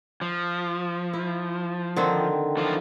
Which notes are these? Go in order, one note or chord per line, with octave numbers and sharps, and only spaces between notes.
F3
E4
D3 D#3 C4
E3 F3 F4